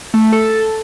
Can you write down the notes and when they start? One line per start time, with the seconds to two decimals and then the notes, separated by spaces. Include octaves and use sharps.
0.14 A3
0.32 A4